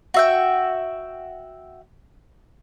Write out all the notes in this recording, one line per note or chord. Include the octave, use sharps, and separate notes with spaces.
F#4 E5 G5